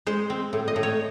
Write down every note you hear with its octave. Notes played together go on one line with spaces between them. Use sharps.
G#3 C5
C4
A2
D#5
A2
C#5